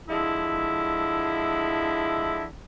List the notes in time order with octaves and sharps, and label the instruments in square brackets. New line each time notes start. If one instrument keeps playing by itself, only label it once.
[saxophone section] D3 F3 G#3 E4